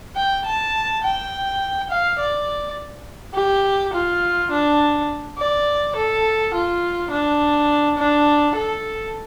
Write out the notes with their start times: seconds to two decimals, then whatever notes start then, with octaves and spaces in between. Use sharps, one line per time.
0.16 G5
0.45 A5
1.03 G5
1.90 F5
2.19 D5
3.34 G4
3.93 F4
4.51 D4
5.38 D5
5.95 A4
6.54 F4
7.11 D4
7.98 D4
8.56 A4